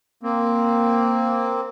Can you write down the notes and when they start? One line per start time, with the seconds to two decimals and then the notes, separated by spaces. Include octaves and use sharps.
0.23 A#3 C4